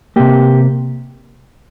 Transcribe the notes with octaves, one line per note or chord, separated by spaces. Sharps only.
C3 A#3 G4